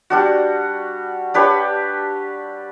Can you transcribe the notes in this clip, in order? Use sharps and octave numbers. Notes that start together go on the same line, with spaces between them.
G3 D4 F#4
D4 G4 B4 C#5